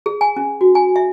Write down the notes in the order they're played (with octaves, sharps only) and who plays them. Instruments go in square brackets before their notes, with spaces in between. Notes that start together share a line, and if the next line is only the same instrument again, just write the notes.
[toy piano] G#4
G#5
C#4
F#4
G#5
E5